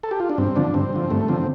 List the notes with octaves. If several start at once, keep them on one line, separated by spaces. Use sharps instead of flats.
A4
G4
F4
D4
G2 C4
D3 F3 D4
G2 C4
D3 F3
G2 A3
D3 F3 C4